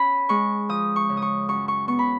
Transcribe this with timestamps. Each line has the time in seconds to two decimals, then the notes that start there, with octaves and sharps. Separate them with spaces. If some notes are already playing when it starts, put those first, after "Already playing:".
Already playing: C#4 B5
0.29 G#3 C#6
0.69 F3 D#6
0.96 C#6
1.09 C#3
1.17 D#6
1.22 C#6
1.48 F#2 C#6
1.68 C#6
1.88 B3 C#6
1.99 B5